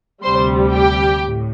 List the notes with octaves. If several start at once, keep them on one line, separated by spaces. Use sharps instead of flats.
D2 C3 G3 C5 C6
G4 G5
A2